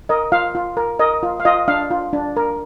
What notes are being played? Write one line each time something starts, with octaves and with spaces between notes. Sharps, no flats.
A#4 D#5
F4 F5
F4
A#4
A#4 D#5
F4
F5
F4 D#5
D4 F5
F4
D4
A#4